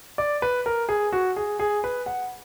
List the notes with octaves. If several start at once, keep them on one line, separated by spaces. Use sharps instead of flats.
D5
B4
A#4
G#4
F#4
G#4
G#4
B4
F#5